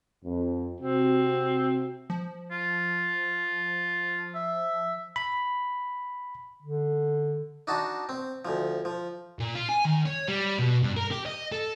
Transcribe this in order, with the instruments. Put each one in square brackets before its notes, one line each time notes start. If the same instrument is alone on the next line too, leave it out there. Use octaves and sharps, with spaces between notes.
[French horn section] F2
[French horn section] C3 F#4 [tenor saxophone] C4
[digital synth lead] F3
[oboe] F4
E5
[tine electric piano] B5
[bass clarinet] D3
[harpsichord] D4 D#4 F#4 A5
C4
D2 F3
F3
[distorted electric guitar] A#2
F4
G#5
D#3
C#5
G3
B2
G2
A#4
G4
D#5
A4